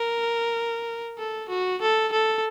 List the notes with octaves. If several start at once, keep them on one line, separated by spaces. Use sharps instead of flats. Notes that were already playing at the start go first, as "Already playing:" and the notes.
Already playing: A#4
A4
F#4
A4
A4